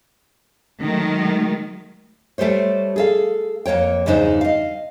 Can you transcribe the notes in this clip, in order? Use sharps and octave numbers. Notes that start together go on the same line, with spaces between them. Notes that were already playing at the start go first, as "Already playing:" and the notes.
D#3 F#3 G#3 A3
G3 A3 G4 C5 C#5
G#4 A4 F5
F2 A#3 C#5 G5
E2 G2 C#3 D4 D#4 C5
D#5 F5